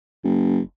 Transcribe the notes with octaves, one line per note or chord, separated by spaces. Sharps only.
F#1